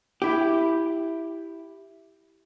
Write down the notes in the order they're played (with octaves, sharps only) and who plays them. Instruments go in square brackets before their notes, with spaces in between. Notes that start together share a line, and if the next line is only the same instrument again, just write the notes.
[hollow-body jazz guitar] E4 G4